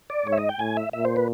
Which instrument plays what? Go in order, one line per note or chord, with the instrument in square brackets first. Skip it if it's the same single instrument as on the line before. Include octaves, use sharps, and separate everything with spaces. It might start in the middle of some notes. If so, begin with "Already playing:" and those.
[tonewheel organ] D5
[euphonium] G#2 [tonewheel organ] C#5
[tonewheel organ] E5
D#5
G5
[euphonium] A2 [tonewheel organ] G#5
[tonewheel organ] E5
[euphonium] A#2 [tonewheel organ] E5
[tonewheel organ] C5
B4